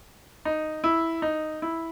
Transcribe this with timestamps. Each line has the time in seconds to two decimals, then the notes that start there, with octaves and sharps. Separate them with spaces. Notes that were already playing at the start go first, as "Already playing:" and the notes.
0.45 D#4
0.84 E4
1.22 D#4
1.62 E4